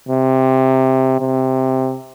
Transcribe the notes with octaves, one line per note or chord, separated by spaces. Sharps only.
C3
C3